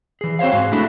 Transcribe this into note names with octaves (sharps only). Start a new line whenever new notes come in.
E3 G#4
C4 F#4 C5 C#5 F5
G#2 G#3 F#4 G#4 F5
A3 D4 E4 F#4 A4